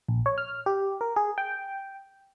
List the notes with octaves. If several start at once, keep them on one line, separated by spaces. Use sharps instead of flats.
A#1
C#5
F6
G4
A#4
G#4
G5